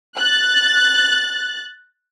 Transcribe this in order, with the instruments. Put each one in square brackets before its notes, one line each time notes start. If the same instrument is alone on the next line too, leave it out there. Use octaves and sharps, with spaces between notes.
[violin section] F#6 A6